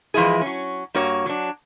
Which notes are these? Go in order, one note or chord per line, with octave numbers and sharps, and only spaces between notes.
E3 F3 G#3 E4 G#4
F#3 C#4
G2 A#3 F#4 C#5
F#3 D4